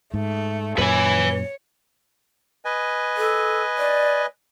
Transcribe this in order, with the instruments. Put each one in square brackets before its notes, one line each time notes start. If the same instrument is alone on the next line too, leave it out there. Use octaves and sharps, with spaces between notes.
[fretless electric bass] G#2 [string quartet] A3
[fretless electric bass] F#2 A#2 [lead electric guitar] B4 G#5 [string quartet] C#5
[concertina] B4 D#5 G#5
[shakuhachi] A4
D5